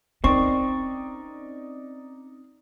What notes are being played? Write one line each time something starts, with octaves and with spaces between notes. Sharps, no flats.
C4 C#4 D#4 A#4 D5 C#6